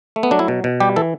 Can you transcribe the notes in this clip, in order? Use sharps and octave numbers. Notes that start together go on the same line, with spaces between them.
A3
B3
F#3 D4
E4
B2
B2
G3 G4
E3 A4